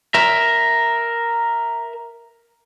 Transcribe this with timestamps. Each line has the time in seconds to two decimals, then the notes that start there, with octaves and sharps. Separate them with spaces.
0.14 A#4 E5